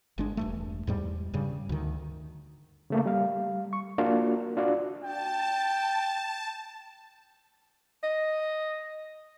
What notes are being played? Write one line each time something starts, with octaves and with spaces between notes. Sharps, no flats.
G1 G#3 D4
E1 G2 A3
E2 G#2 G3
G2 C#3 G3
D2 D#3
C#3 A3 A#3
G3 F5
C#6
A#3 D4 F4 F#4 A#4
D4 F4 F#4 D5
G5 A5
D#5